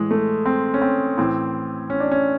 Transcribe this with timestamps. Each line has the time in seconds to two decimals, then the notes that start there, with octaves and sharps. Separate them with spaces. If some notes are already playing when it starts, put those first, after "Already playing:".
Already playing: A2 E3 G#3
0.11 A3
0.46 C4
0.74 C#4
0.82 C4
1.18 A2 E3 C4
1.90 C#4
2.00 D4
2.11 C#4